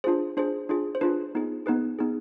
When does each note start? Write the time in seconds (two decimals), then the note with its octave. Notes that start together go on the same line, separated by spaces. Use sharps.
0.04 D4 F4 G#4 C5
0.37 D4 F4 G#4 C5
0.69 D4 F4 G#4
0.95 C5
1.01 D4 F4 G#4 B4
1.35 B3 D#4 G#4
1.66 B3 D#4 G#4 B4
1.99 B3 D#4 G#4